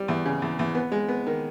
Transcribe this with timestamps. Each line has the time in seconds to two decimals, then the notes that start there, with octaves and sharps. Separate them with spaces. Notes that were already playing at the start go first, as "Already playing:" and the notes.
Already playing: G3
0.08 E2
0.25 C#3
0.42 E2
0.59 E2
0.75 B3
0.92 G#3
1.08 B3
1.27 D#3